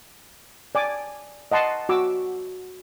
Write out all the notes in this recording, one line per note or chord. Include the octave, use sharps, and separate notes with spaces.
D5 G#5 D6
D#5 F#5 A5 C6
F#4 D6 E6